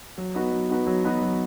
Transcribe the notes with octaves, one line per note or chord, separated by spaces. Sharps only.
F#3
B3 D#4 F#4 B4
F#3
B3 D#4 F#4 B4
F#3
B3 D#4 F#4 B4
F#3